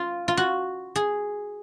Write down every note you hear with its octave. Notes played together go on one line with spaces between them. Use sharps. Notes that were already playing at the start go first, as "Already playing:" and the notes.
Already playing: F4
F4
F#4
G#4